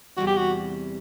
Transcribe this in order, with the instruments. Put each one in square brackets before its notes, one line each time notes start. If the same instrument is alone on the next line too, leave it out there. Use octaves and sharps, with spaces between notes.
[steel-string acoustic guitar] E2 C3 E3 G3 C4 [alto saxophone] F#4
[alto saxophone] G4
F#4